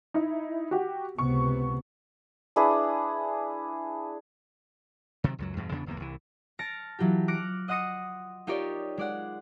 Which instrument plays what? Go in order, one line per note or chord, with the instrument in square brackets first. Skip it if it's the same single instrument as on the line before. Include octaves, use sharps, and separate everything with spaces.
[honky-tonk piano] D#4 E4
F#4 G4
[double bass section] C#2 C3 B3 [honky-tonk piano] C#6
[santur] D4 E4 G#4 B4
[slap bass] C3 D#3 F3 F#3
C#2 F#2 F#3
E2 G2 B2
E2 C#3 B3 D4
G1 E2 A#2 A#3
C2 E3
[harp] A5 F6 A#6 C#7 D7
E3 F#3 F4 G4
D6 F6 F#6 A#6 C#7 D7
D#5 F#5 C6 D#6 A#6 C#7
D#4 F4 G4 A#4 C#5 D5
G#3 D5 F#5